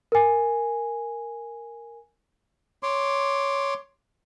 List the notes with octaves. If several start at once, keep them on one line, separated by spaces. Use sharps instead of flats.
A#4 G#5
C#5 C6 D6